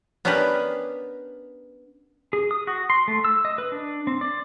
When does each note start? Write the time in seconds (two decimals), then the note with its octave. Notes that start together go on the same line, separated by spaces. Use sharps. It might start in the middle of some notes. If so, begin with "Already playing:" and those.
0.25 B3 C#4 D4 G4 A#4 B4
2.33 G#4
2.51 D#6
2.67 F#4
2.90 C6
3.08 A3
3.25 E6
3.45 D#5
3.58 B4
3.72 D4
4.07 C4
4.21 D5